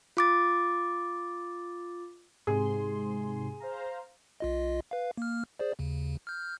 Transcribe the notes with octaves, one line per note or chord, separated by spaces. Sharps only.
F4 D6 A6
G#2 C3 G#4 C6
C5 F5 A#5
B1 F4 D#5
B4 F5
A#3 F6
G#4 C5 D5
D#2 C#3
F6 G6